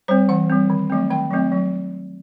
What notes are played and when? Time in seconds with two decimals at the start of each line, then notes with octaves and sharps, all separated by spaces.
0.08 G3 C4 C5
0.29 E3 F#5
0.50 G3 C4
0.70 D#3
0.90 F#3 A3 C4
1.10 D#3 G5
1.31 F#3 A3 C4
1.52 F#3